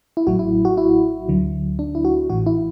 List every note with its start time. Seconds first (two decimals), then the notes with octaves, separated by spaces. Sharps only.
0.17 E4
0.27 A1 A2 F#3 F#4
0.39 E4
0.65 F#4
0.77 E4
1.28 D2 D3 F#3
1.79 D4
1.95 E4
2.05 F#4
2.30 A1 A2 E3 F#4
2.46 E4